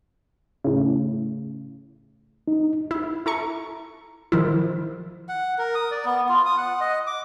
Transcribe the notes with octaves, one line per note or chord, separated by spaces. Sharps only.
A2 C#3
D#4
E4
E4 A4 A#5 C#6
D#3 F3 E4
F#5
A#4
D#6
D5
B3
F4
D#6
F#5
D#5
D6